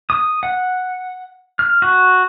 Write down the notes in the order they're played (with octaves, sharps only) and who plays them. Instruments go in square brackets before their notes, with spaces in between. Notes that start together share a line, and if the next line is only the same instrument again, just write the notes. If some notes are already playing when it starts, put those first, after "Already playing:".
[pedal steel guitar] D#6
F#5
F6
F#4